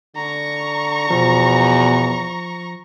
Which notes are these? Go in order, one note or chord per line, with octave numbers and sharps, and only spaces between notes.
D3 A#5 C#6
E2 B2 F3